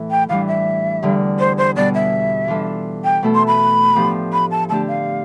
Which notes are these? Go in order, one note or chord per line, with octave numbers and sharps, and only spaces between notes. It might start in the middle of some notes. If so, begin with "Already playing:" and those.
Already playing: A2 E3 A3 E4 A4
G5
A2 E3 G3 D4 F5
E5
E2 D3 G3
C5
C5
B2 G3 B3 D5
E5
E3 G3 D4 F4 A4
G5
B2 A3 E4 A4
C6
B5
A2 F3 B3 D4 G4
B5
A5
D3 A3 D4 G4 A5
F5